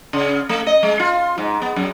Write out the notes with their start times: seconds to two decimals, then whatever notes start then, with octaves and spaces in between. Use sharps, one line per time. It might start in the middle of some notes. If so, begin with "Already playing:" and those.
0.13 C#3
0.49 A3
0.67 D#5
0.83 G#3
0.99 F4
1.38 G#2
1.62 B3
1.76 F#2